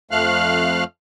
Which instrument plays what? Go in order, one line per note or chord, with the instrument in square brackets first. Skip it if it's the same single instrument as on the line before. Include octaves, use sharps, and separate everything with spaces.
[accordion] F2 F3 A3 F5 F6 F#6